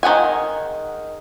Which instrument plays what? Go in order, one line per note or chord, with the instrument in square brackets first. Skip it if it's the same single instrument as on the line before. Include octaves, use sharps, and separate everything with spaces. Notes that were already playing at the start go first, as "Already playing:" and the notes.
[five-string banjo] D#3 G#4 F#5 G#5